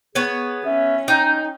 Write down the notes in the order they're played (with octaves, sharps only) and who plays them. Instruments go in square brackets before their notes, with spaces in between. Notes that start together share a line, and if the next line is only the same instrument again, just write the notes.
[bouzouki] B3 B4 C#5 [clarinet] G#4
[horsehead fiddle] C#4 [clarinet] E5
[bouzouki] D#4 [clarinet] G5